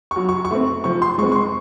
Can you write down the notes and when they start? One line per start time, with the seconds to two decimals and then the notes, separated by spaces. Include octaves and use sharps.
0.11 C#6
0.16 F#3
0.29 C#6
0.45 C#6
0.51 A3 C4
0.84 F3 C#6
1.02 C6
1.18 G#3 C#6
1.23 C4
1.32 C#6
1.36 C6